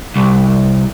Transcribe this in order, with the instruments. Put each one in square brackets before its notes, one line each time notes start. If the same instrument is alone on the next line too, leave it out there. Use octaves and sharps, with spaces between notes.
[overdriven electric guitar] C2